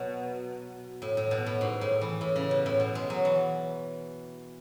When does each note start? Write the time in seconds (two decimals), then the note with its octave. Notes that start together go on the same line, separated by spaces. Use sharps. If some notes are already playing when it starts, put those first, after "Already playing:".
Already playing: B2 F#3
1.02 A2
1.17 A2
1.31 B2
1.46 A2
1.61 G#2
1.81 A2
2.01 E3
2.21 A2
2.36 C#3
2.51 B2
2.66 A2
2.80 B2
2.95 G#3
3.10 F#3
3.25 E3